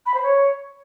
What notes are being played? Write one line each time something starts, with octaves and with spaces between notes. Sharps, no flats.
B5
C5
C#5